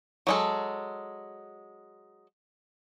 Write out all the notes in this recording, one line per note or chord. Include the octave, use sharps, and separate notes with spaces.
F#3 G#3 A4